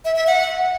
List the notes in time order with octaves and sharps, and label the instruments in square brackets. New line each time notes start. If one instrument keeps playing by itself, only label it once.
[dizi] E5
E5
F#5